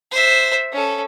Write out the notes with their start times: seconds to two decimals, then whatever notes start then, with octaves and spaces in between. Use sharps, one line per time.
0.11 C5 E5
0.72 C#4 A4